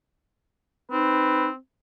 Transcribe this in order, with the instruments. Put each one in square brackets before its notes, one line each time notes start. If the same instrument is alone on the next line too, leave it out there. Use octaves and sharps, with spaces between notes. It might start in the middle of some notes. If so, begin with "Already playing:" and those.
[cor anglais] C4 [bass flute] D#4 [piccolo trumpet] B4